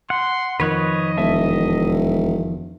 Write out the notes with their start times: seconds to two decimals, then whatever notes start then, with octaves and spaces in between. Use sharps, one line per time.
0.10 F#5 C6
0.60 F2 D#3 B4 C#5 D#5 F#6
1.17 E1 E5 A5